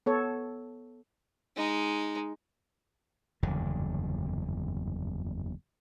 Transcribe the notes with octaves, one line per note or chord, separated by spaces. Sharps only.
B3 A4 C#5
G#3 D#4
F#1 E2 G2 D3